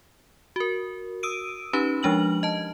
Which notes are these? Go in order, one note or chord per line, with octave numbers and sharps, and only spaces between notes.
F#4 A#4
D#6 E6 D7 D#7
C#4 D#4 G4 B4 B5
F3 G#3 D4 F6 F#7
D#5 A5